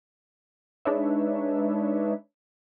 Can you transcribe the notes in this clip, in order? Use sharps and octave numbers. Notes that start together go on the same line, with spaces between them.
G#3 D4 D#4 B4 C#5 E5